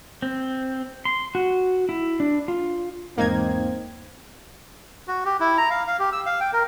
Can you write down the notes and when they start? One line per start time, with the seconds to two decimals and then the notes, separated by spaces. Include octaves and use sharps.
0.22 C4
1.05 C6
1.35 F#4
1.89 E4
2.20 D4
2.48 F4
3.18 E2 G#2 A#3 C4 D#4 G#6
5.08 F#4
5.25 G4
5.40 E4
5.58 A#5
5.70 F5
5.87 F5
5.99 G4
6.12 E6
6.26 F5
6.40 G5
6.53 A#4